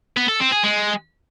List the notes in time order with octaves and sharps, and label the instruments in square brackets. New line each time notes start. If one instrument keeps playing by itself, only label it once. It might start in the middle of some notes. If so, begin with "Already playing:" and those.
[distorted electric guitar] B3
A4
C4
G#4
G#3